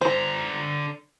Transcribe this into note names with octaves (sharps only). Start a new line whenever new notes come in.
D3 C5 A#5